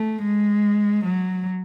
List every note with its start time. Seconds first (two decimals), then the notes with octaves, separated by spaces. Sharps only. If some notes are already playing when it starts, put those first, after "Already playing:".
Already playing: A3
0.23 G#3
1.05 F#3